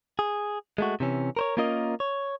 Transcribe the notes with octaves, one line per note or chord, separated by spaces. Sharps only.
G#4
G#3 A3 F#4
C3 E3 C#4
A#4 C5 C#5
A#3 C#4 F4 A#4 D#5
C#5